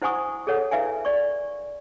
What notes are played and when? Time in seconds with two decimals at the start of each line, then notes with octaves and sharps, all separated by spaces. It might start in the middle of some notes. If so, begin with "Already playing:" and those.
0.02 E4 C5 F#5 G#5 C#6 D#6
0.47 G#4 A4 C#5 F#5
0.71 E4 B4 E5 F5 G#5
1.05 D5 C#6